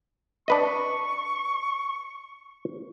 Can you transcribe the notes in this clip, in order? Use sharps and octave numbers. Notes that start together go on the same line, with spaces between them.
D4 B4 D#5 C#6